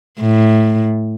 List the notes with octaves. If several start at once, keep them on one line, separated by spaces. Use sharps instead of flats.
A2